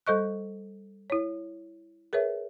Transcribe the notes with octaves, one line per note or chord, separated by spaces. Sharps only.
G3 A4 C5 D#5 C#6 F#6
E4 C#5
G#4 A#4 B4 C#5 E5